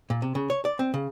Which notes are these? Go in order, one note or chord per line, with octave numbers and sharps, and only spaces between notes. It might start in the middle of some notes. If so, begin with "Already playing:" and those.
A#2
C3
C#3
C#5
D5
C4
C#3